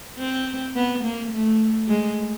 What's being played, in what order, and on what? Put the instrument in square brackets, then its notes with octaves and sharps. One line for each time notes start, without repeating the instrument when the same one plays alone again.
[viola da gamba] C4
B3
A#3
A3
G#3